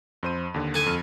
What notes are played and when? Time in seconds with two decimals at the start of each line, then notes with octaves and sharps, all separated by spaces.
0.23 F2 C5 D#7
0.54 D#2 D3
0.74 A4 G#5
0.86 F2 F6 D#7